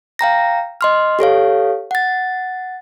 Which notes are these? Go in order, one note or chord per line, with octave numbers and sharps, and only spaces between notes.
F5 G5 A#5 A#6
D#5 C6 F6
G4 A4 C#5 F5
F#5 A6